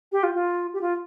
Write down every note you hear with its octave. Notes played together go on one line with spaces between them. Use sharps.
G4
F4
F4
G4
F4